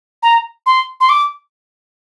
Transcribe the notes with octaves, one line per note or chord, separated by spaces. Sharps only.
A#5
C6
C6
D6